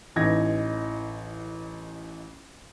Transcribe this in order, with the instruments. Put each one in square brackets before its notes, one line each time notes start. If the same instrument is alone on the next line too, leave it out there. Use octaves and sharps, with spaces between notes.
[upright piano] A1 E3 D#4 G#6 A#6